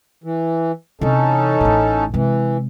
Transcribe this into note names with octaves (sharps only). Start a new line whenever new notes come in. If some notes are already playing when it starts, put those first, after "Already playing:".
E3
C3 E3 C#4 D#4 A4
A1 A2
C3 E3 G#3